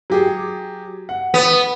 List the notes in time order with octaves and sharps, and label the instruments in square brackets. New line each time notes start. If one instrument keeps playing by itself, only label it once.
[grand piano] F#3 G4 G#4
F#5
[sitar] B3